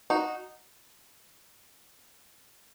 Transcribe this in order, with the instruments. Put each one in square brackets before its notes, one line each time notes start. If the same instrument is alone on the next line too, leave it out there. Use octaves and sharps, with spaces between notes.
[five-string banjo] D#4 F#4